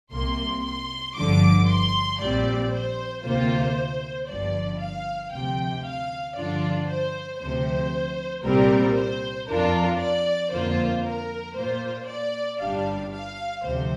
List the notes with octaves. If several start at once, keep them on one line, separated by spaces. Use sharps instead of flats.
C2 C3 A#3 C6
C6
G1 G2 D3 F3 D6
C6
A#1 A#2 G3 C4 D5
C5
D2 C3 A#3 F4 C5
G1 G2 F3 D5
F5
D2 C3 F3 G5
F5
G2 D3 F3 D4 F4 D5
C5
D2 C3 F3 C5
C2 A#2 G3 C4 A#4
C5
F2 F3 D4 F4 A#4
D5
F2 D3 A#3 F4 C5
A#4
A#2 A#3 F4 C5
D5
G1 G2 G3 D4 F5
F5
D2 C3 F3 C5